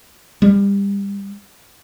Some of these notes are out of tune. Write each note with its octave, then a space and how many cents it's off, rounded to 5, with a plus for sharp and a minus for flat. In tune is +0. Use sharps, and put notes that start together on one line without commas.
G3 +30